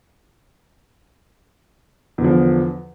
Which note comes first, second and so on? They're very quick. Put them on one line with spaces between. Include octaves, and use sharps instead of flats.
E2 D3 F3